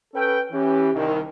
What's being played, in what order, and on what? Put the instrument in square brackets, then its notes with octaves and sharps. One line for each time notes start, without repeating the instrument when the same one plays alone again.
[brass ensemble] C#4 A4 B4 G5
E3 C#4 G4
C2 D#3